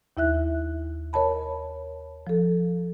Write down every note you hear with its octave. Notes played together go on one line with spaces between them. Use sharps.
D#2 E4 E5 F#6
A#4 C#5 D#5 A5 B5
F3 A4